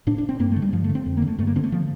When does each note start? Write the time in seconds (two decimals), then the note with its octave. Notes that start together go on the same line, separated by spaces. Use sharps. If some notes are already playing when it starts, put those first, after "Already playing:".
0.07 A2 D4
0.18 D4
0.29 C4
0.40 G2 A#3
0.52 D3 A3
0.62 G3
0.73 G2 F3
0.84 A3
0.89 D3
0.95 C4
1.06 F2
1.17 A#3
1.22 D3
1.27 A3
1.39 G2 A3
1.47 A#3
1.56 D3 C4
1.64 A3
1.72 F3